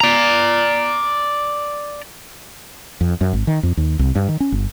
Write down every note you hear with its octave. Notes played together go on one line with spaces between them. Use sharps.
D5 A#5
F2
F#2
G#1
D#3
F2
D#2
C2
G2
D#3
C#4
G1